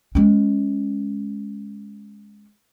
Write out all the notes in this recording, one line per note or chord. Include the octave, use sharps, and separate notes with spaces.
G#3 C#4